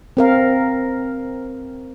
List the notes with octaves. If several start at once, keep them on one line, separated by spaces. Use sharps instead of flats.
C4 A#4 F5